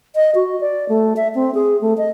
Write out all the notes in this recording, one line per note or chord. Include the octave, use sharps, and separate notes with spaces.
D#5
F#4
D5
A3
E5
C4
G#4
A3
D#5